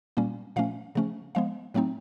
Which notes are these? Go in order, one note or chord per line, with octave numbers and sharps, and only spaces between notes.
A#2 G3 A#3 C#4
A#2 F3 A3 C#4 F5
C#3 F3 A3 C#4
F3 G#3 B3 F5
A2 F#3 A3 C4 D#4